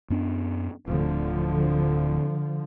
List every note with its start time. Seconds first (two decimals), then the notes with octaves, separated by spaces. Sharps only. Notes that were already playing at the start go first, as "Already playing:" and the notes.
0.10 F#2 B3 D4
0.87 D1 D2 D3 F3